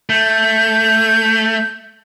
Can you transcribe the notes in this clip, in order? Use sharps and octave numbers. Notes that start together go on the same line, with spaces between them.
A3 G6